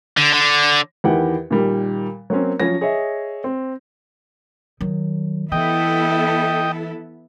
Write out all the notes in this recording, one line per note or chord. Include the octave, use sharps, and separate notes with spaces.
D3
D3
E2 D#3 E4 G4 F#5 G5
A#2 D#3 G3
F#3 A#3 C4 C#4
F3 F#3 C#4 A#6
G#4 C#5 D#5 E5
C4
D#3 F#3
E3 B3 E4 A4 D#5 G5